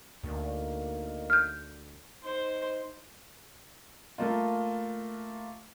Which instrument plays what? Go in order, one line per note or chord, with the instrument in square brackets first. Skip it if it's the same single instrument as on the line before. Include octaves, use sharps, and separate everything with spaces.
[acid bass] D2 [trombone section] A#3 D#4
[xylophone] F6 G6
[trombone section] D#4 [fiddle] C5
[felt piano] A3 A#3 F4